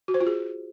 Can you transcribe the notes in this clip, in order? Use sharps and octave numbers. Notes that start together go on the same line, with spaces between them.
F#4
C5
F4
G#4